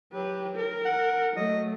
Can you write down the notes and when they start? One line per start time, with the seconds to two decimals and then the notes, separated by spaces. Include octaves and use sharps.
0.13 F#3 G4 B4
0.56 A#4
0.85 F#5
1.36 F#3 A3 D#5